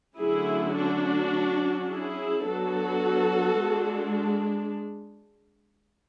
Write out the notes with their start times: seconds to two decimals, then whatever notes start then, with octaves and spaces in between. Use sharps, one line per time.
0.19 D3 F#3 A3 C#4 E4 G#4
0.76 D4 F#4
1.33 F#3 C#4
1.90 E4 G#4
2.48 F#3 B3 D4 F#4 A4
3.62 G#3 D4